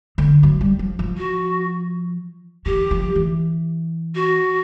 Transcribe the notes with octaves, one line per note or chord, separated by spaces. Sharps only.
D3
F#3
G3
F3
F3
F#4
E3 G4
F3
E3
F#4